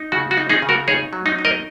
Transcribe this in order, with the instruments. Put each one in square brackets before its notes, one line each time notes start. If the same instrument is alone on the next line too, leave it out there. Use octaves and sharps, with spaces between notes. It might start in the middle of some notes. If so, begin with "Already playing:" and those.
Already playing: [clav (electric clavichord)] D#4
C#3 F#4
F#4
D#4
D#4 G#4
C#3
F#4 A#4
D#4 G#4 C#5
F#3
D#4
D#4
A#4 D#5